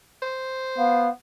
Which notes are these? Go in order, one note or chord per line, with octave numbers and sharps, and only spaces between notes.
C5
B3 F5